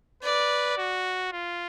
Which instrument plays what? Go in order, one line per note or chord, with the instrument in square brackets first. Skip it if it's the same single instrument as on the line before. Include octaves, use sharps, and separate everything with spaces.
[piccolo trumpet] B4 [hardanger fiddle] D5
[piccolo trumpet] F#4
F4